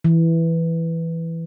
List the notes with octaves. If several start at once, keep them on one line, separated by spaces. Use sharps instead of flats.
E3